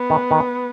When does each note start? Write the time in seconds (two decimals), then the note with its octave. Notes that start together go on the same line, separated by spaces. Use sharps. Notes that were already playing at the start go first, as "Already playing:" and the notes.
Already playing: B3
0.10 D#3
0.31 D#3